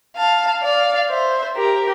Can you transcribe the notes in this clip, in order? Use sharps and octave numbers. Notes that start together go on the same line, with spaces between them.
F5 A5
D5 F5
C5 E5
G4 A#4